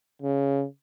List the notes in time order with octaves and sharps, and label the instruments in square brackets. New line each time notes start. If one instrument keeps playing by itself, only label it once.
[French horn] C#3